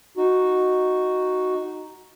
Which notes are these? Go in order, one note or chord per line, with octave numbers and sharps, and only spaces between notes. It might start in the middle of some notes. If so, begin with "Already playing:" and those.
D#4 F#4